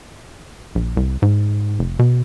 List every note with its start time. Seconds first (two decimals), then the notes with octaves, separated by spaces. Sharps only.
0.75 A#1
0.97 C2
1.22 G#2
1.79 F1
1.99 B2